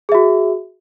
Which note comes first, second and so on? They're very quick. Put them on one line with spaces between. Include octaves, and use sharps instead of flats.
G#4 E5 F#4